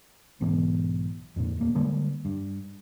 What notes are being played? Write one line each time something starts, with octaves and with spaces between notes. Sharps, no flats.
B1 G#2 E3 B3
F2 A#2
D#1 A#3
D3 G3 G#3 A#3
G2